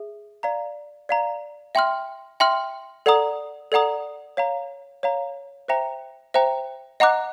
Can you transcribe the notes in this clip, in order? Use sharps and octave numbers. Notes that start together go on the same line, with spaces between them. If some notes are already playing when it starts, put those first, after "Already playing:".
Already playing: G#4 E5
D5 F5 A#5
D5 F5 A#5
E5 G5 C6 F6
E5 G5 C6 F6
A4 D5 F#5 A#5 D#6
A4 D5 F#5 A#5 D#6
C#5 F5 A#5
C#5 F5 A#5
C5 E5 G5 A#5
C5 E5 G5 A#5
D#5 F#5 A#5 D6 F#6